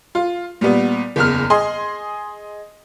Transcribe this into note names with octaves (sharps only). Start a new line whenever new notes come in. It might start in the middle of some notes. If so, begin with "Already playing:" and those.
F4
A#2 G3 B3
F#1 E2 F6
G#4 D#5 C6